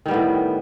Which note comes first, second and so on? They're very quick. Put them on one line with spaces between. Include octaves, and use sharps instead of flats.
D#3 G3 B3 A2